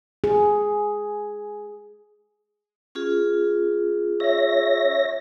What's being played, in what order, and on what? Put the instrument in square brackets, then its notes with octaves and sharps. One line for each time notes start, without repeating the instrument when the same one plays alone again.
[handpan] G#4
[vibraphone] C#4 F4 G#4
[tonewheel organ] C#5 E5 A#6